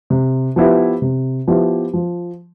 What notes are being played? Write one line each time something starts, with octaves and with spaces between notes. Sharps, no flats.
C3
F3 B3 E4 G4
C3
F3 B3 E4 G4
F3